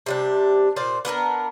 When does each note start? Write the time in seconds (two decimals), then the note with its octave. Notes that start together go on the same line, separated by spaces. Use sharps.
0.06 C3 G3 D4
0.76 A#2 C5 D5
1.05 B3 D4 A4 A#4